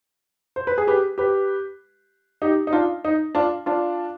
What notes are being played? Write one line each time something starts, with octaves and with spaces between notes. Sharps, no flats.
C5
B4
G#4
G4 B4
G4 B4
D#4 G4
D#4
D4 F4
D#4
D4 F4
D4 F4